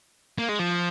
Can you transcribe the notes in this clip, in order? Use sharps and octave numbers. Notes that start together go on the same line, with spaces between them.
A#3
G#3
F3